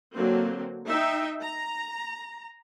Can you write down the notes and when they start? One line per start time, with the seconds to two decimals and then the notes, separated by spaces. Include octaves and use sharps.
0.15 D3 F#3 A#3 C4 F#4
0.86 D#4 E5 G5
1.42 A#5